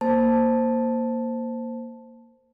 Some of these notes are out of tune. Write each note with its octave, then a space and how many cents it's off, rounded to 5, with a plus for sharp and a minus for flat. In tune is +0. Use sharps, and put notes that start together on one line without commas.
A#3 +0 C5 +0 A5 +0